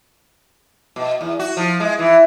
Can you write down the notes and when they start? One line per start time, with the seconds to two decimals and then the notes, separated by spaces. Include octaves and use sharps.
0.96 B2
1.21 E2
1.39 F#4
1.57 F3
1.80 G#3
1.99 E3